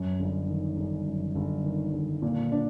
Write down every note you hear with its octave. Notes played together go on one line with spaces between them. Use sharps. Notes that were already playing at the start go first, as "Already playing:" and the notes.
Already playing: F#2
G1
D#3
G1
F#2
G1
D#3
G1
A#2
D4